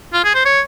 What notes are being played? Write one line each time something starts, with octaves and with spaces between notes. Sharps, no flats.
F4
G#4
C5
C#5